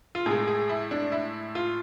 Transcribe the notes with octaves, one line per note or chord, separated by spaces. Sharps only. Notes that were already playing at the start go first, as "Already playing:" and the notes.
F4
A2 G#3 G#4
G#4
E4
D4
E4
F4